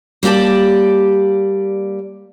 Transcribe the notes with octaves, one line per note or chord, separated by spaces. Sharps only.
G3 A#3 G4 D5 A5